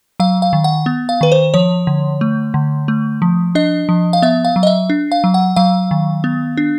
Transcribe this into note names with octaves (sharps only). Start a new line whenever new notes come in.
F#3 F5
F5
D#3
F#5
B3
F5
D#3 B4
C5
F3 C#5
D3
A3
D3
A3
F3
D4 D#5
F3
F5
B3 E5
F5
F#3
D#5
E5
D4
F5
F#3
F#5
F#3 F5
D#3
B3
D4